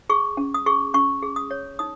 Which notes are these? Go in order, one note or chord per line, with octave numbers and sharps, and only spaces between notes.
G#4 C#6
C#4
D#6
G#4 C#6
C#4 C#6
G#4
D#6
C#5
D#4 D#6